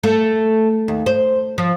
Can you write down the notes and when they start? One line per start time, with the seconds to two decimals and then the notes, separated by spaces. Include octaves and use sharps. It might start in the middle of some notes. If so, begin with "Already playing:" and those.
0.03 A3
0.88 D#2
1.06 C5
1.58 F3